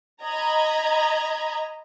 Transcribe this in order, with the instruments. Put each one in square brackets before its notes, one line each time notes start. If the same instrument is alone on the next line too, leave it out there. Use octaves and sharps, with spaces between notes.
[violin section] D#5 A#5 B5 G#6